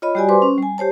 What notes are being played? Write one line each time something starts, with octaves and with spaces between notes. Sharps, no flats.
F4 C#5 D#5 B5
G3 F#4 G4 D5 G#5
B4 C5 C6 D6
C#4
G3 G#5
G4 C5 C#5 A5